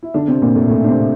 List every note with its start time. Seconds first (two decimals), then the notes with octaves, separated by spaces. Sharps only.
0.03 E4
0.14 D3 D4
0.28 C3 C4
0.42 A#2 A#3
0.55 A2 A3
0.69 A2 A3
0.84 D4
0.88 C3 C4